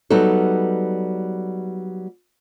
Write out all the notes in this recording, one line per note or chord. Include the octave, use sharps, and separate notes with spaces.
F#3 G3 B3 D#4 A4